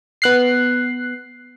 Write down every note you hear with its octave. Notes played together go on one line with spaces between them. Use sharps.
B3 F#6 C7